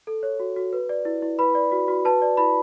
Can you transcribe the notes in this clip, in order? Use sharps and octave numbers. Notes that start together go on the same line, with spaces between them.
A4
C#5
F#4
F#4
B4
D5
E4
E4
B4 B5
D5
F#4
F#4
B4 A5
D5
E4 B5